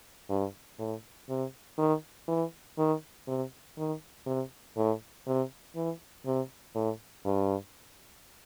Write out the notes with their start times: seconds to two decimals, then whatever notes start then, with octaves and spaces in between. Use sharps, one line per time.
0.30 G2
0.79 A2
1.29 C3
1.78 D#3
2.28 E3
2.78 D#3
3.27 C3
3.78 D#3
4.26 C3
4.76 A2
5.27 C3
5.75 E3
6.26 C3
6.75 A2
7.25 G2